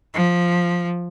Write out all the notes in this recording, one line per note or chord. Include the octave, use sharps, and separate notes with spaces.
F3